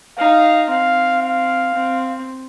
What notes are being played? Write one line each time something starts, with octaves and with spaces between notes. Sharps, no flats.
D#4 F5
C4 F5
F5
C4